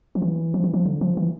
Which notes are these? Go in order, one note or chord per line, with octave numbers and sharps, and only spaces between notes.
F3
E3
F3
E3
F3
D3
F3
E3